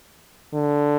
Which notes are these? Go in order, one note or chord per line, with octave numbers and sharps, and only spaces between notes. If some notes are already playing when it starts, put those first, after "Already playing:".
D3